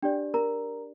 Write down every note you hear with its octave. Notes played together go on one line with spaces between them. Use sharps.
D4 G4 D5 G5
A#4 A#5